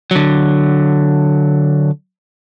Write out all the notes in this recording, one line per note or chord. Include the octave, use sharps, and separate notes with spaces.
D3 F#3